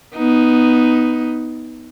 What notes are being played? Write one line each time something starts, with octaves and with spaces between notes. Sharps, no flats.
B3 D#4